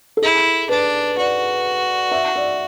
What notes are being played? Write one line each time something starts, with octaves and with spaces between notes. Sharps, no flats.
A4
E4 G#4
D4 B4
F#4 D5
E5
D5